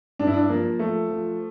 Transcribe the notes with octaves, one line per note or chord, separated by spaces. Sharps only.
G2 D4
E4
D4
F3 A#3
F3 A3
F3